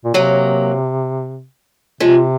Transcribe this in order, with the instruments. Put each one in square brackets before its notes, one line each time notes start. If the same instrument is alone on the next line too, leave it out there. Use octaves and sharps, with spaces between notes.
[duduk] A#2
[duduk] C3 [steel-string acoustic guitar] F#3 A#3
[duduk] C3 [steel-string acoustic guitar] F3 G#3